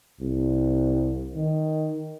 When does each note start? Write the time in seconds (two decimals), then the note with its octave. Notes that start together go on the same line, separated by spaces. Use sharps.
0.20 C2
1.35 D#3